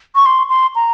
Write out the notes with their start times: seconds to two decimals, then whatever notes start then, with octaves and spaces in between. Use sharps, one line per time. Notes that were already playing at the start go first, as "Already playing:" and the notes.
0.15 C#6
0.26 C6
0.49 C6
0.75 A#5